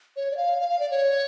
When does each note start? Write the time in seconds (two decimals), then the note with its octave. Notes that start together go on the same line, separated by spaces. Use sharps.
0.16 C#5
0.31 D5
0.37 F5
0.58 F5
0.69 F5
0.79 D5
0.91 C#5